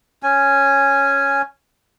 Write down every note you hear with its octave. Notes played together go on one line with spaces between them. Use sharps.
C#4 G#5